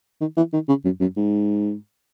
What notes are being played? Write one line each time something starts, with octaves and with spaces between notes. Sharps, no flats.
D#3
E3
D#3
C#3
F#2
F#2
G#2